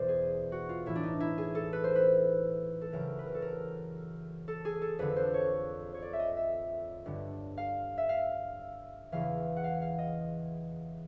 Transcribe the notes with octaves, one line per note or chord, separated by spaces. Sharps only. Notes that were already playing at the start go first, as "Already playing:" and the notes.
Already playing: E2 B2 C5 D5
G#4
F#4
F4
A2 E3 E4
D4
D#4
E4
G#4
A4
B4
C5
B4
A4
F#2 C#3 E3 A#4
B4
A#4
A4
A#4
A4
G#4
A4
F2 D3 B4
C5
C#5
C#5
D5
E5
D#5
E5
G2 D3
F5
E5
F5
E2 C#3 E3 F5
F#5
F5
F5
D#5